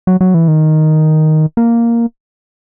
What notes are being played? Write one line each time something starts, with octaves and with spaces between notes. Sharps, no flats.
F#3
F#3
E3
D#3
A#3